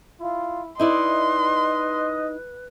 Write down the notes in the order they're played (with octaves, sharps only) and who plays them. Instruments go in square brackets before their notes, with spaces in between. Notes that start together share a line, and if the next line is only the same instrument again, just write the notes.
[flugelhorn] E4 [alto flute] F4
[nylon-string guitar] D#4 E4 D5 [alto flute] B4 [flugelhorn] D#5 [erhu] C6